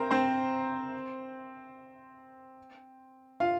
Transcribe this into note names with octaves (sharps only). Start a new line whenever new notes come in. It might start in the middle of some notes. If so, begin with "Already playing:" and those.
Already playing: C4 A#4 C5 A#5
C4 C5
F4 F5